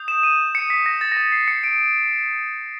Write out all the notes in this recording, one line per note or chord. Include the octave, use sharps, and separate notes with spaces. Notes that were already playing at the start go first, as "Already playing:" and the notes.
Already playing: D#6 G6
E7
D#7
C#7
B6
A#6
A6
A#6
A6
C7
C#7
D7